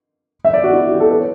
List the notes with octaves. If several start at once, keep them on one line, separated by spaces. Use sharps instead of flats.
E5
D5
F#4
E4
F#4
G4
A4
B4
C#5